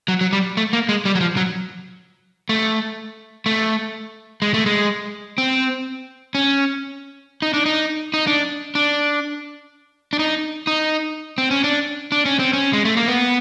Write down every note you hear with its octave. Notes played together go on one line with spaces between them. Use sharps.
F#3
F#3
G3
A3
A#3
G#3
G3
F#3
F3
F#3
A3
A3
G#3
A3
G#3
C4
C#4
D#4
D4
D#4
D#4
D4
D4
D4
D#4
D#4
C4
C#4
D4
D4
C#4
C4
C#4
G#3
A3
A#3
B3